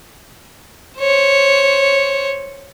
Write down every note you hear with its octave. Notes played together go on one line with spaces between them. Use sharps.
C5 C#5